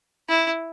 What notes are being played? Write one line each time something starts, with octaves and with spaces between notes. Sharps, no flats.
E4